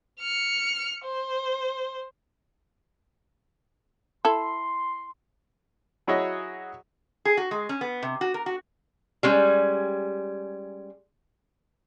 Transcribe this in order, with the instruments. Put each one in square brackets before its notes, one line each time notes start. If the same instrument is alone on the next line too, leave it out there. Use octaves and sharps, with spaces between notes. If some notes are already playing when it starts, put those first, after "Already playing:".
[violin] F6 C#7
C5
[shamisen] E4 A4 [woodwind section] C6
[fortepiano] F#3 E4 F#4 G#4 C#5 D#5
[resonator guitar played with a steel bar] G#4
F#4
G#3
C#4
B3
C3
F#4
A#4
F#4
G3 G#3 C#4